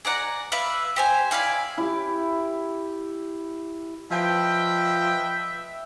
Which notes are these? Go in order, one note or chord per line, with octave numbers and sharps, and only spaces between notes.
G#4 D5 F#5 A#5
B4 D5 E5 F5
G4 C5 G#5
E4 D5 F5 G#5
E4 G4
F3 B4 D#5 E5 G5